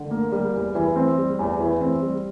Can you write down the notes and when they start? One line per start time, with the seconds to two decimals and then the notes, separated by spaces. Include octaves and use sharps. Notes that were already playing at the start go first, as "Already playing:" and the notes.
Already playing: D3
0.11 A#3
0.32 G3
0.54 E2
0.75 E3
0.96 C4
1.18 G3
1.39 E2
1.60 E3
1.81 C4
2.02 G3